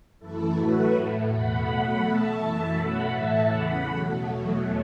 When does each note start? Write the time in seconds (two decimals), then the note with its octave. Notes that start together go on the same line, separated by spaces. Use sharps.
0.19 F#2 E3 A3 E4 A4
0.55 A2 F#3 A3 F#4 B4
0.92 A2 A3
1.28 E2 B2 A3 F#5 B5
1.64 B2 F#3 A3 F#5 B5
2.01 B2 A3 E5 A5
2.37 F#2 E3 A3 E5 A5
2.74 B2 F#3 A3 F#5 B5
3.10 A2 E3 A3 E5 A5
3.47 E2 C#3 E3 F#5 B5
3.83 B2 F#3 A3
4.20 E2 B2 F#3 A3